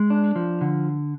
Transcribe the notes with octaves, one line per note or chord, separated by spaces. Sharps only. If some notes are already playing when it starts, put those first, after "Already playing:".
Already playing: G#3
D4
F3
D3